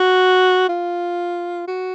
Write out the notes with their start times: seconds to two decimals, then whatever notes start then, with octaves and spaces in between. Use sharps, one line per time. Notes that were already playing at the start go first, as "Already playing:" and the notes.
Already playing: F#4
0.69 F4
1.68 F#4